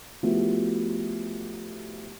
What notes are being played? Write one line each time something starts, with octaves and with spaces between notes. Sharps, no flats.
F3 A3 B3 E4 F#4 G4